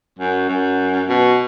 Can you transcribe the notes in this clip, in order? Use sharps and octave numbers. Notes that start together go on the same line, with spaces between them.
F#2
F#2
B2